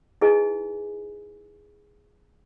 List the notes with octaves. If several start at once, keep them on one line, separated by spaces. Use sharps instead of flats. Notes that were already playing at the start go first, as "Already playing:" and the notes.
D#4 E4 G#4 B4 D#5 G#5